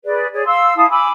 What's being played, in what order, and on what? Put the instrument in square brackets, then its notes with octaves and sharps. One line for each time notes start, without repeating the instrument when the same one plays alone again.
[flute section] G#4 B4 D5
G#4 C#5 D5
F5 C6 E6
E4 F5 A5 D#6
G#5 B5 D6 E6